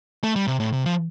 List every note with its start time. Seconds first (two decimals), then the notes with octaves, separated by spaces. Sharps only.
0.24 A3
0.36 G3
0.47 C3
0.60 A2
0.73 C3
0.85 F3